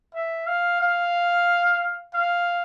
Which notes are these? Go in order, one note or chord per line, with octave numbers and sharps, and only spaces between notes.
E5
F5
F5
F5